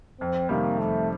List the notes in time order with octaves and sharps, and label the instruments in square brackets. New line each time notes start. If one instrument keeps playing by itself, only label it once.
[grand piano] F2 [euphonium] C4
[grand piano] C3 D#3 G3 [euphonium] A#3
[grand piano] F2 [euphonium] A3